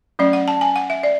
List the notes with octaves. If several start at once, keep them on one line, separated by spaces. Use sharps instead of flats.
F#3 A3 C#4 D5
F#5
A5
G#5
F#5
E5
D5